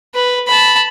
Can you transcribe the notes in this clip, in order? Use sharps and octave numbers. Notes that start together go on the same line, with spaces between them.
B4
A5 B5